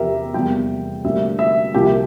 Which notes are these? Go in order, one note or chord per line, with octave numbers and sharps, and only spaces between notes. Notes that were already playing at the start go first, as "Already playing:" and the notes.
Already playing: E2 C3 F3 G4 A#4 E5
F1 E2 C3 G3 A#3 G5
D2 C3 G3 A#3 E5
E5
C2 C3 F3 A#3 G4